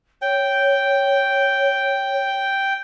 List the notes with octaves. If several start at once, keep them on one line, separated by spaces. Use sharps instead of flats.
C#5 G5